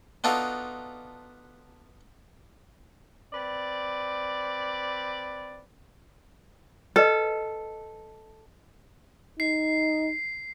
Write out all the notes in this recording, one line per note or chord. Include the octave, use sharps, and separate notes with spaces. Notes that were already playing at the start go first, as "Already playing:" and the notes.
B3 D4 D#4 F4 F#4 A4
C4 B4 D5
A4 B4 D#5
D#4 C7